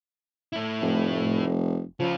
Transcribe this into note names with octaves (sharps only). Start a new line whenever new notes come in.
A3 E4
F1
C#3 F3 F4